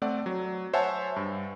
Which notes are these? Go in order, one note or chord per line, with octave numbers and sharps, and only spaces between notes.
A3 C4 D5 F#5
F#3
C5 C#5 E5 F#5 G#5 A5
G2